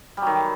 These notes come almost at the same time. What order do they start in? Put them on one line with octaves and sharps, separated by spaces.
G3 F#3 D#3